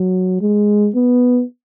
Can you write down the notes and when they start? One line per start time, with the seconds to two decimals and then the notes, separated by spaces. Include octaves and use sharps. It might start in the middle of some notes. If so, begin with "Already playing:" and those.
Already playing: F#3
0.41 G#3
0.95 B3